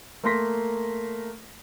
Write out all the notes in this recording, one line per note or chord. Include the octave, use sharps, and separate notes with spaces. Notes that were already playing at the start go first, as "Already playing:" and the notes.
A3 A#3 A#4 C6 A#6 B6